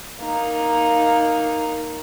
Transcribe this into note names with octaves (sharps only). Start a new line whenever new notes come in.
A#3 D#4